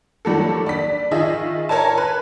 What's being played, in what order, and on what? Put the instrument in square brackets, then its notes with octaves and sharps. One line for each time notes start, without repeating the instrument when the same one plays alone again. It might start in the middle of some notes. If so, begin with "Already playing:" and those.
[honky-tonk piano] D#3 F#3 G3 A#3 A4
D4 B6
D#3 F4 G#4 D#5 E5
A#4 C#5 G#5 A5
B4